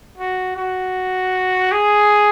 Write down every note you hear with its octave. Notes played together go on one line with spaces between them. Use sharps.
F#4
F#4
G#4